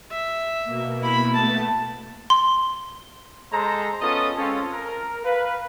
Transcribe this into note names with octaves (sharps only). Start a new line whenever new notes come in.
E5
B2 A#3
E4 B5
A3 B3 A5
C6
G#3 A4 C5 A#5
B3 C#4 F4 A4 D#5 D#6
G#3 C4 C#4 F4 A4
A#4
B4 F5